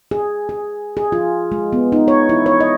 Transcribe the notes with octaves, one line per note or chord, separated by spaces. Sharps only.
G#4
G#4
G#4
F4
G#3
B3
D#4
C#5
E4
C#5
D#5